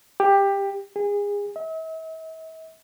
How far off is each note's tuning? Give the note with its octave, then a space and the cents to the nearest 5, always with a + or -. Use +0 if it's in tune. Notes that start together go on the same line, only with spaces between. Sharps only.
G4 +15
G#4 -30
E5 -45